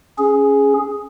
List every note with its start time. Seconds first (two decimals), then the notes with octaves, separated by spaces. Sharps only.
0.19 C#4 G#4